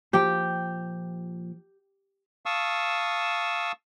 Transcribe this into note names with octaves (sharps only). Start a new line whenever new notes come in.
A#2 F3 G4 G5
F5 A5 C#6 D#6 E6